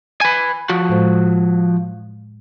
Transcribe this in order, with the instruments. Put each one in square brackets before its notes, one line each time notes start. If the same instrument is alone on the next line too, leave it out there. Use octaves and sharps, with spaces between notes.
[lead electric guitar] B4 G#5
F3 F#4
[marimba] A2 G#3 C5